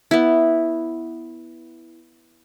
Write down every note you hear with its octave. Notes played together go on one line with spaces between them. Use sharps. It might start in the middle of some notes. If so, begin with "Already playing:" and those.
B3 E4